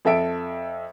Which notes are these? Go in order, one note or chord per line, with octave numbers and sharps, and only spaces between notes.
F2 A4 E5 D7